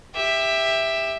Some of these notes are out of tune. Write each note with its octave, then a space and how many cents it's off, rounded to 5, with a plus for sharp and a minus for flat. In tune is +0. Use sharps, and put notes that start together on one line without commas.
G4 +20 E5 +0